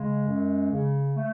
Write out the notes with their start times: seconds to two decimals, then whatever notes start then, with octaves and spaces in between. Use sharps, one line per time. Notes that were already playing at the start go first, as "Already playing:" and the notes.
Already playing: C#3 G#3
0.27 F#2
0.71 C#3
1.17 A3